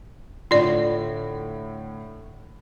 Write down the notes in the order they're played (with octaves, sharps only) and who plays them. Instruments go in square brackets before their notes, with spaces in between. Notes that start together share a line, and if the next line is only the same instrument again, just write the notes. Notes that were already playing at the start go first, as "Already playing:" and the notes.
[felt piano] A2 D3 [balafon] F4 D5